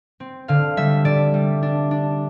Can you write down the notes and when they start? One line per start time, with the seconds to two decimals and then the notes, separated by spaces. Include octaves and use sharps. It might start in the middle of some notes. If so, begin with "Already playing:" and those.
0.20 C4
0.48 D3 F5
0.77 G3 E5
1.05 D3 D5
1.34 G3
1.63 D4
1.91 D4